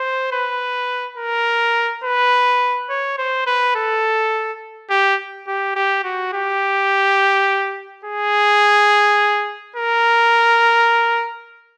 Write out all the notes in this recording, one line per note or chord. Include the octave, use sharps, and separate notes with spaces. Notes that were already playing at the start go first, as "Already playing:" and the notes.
Already playing: C5
B4
A#4
B4
C#5
C5
B4
A4
G4
G4
G4
F#4
G4
G#4
A#4